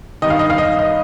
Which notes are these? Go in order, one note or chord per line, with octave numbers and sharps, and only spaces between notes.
G2 D#3 D#5
F5
D#5
F5
D#5
D#5